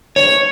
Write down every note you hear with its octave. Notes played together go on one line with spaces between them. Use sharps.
C#5